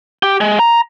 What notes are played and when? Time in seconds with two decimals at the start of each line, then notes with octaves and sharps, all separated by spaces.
0.23 G4
0.41 G#3
0.59 A#5